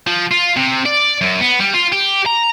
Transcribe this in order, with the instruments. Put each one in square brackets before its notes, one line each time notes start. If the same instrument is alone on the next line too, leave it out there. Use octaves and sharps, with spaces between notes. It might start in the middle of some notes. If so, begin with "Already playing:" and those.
[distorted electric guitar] F3
F4
C3
D5
F#2
B3
G3
F4
G4
A#5